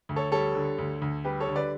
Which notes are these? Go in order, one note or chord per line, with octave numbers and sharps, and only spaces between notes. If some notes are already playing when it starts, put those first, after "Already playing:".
D2
A4 C#5
G3 A4 C#5
D3
D2
D2
G3 G4 B4
A4 C#5
D3
B4 D5